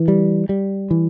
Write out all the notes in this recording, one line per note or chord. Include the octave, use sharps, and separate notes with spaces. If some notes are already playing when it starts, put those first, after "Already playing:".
Already playing: E3
G3
G3
E3